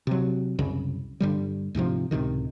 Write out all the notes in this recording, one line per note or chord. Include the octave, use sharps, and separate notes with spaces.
C3 F#3
C2 F#2 C#3
G2 D3 G3
D2 G#2 C3 F3
C#2 A2 C3 D#3